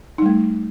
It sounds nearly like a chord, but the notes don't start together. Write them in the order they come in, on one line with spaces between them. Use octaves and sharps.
D#4 G3 A3